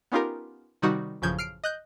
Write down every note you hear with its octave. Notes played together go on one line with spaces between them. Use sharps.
B3 C#4 D#4 F4 G4 A#4
C3 D#3 G3 D#4 F#4
A1 F#2 C#3 F3 G6 G#6
F6 C7 D7
D#5 F#6 G6